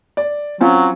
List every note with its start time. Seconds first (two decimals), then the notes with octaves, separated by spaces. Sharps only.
0.17 D5
0.61 F#3 C4 C#4 F4